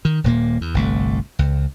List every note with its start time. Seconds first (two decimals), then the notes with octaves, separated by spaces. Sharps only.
0.05 D#3
0.24 D#1 A#2 A#3
0.61 E2
0.74 G1 C2 A3
1.39 C#2